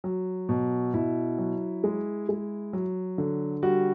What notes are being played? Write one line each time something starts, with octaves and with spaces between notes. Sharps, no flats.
F#3
B2
B2 E4
F#3
G#3
G#3
F#3
D3
G3 F#4